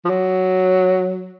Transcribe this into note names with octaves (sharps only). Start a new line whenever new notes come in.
F3
F#3